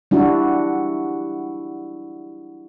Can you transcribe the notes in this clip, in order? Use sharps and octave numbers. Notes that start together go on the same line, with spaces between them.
G3 D4 E4 F#4